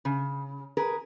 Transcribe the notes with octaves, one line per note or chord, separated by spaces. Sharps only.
C#3
G#4 A#4 B4